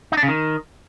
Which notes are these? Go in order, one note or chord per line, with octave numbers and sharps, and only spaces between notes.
D#4
D4
C#3
D#3